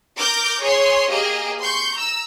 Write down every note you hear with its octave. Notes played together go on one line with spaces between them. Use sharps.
A#4 D6 G6 A#6
G#4 C#5 C6
A#3 G4 G#4 D#5
C6 C#6 G6
A#5 E6